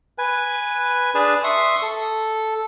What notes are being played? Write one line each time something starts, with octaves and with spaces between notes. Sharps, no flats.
B4 G#5
D4 G#4 B4 A5
E5 C6 C#6 D#6
A4